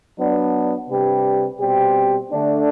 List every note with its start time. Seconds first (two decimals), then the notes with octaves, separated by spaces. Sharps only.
0.17 F#3 B3 D4
0.88 C3 G3 D4 G4 B4
1.59 B2 G3 C4 G4
2.31 D3 A3 D4